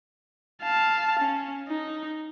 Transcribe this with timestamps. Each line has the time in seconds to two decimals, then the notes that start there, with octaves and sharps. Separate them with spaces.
0.63 F5 A5
1.19 C#4
1.68 D#4